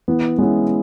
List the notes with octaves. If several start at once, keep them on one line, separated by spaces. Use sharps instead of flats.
E3 B3
G#3 B3 C#4 E4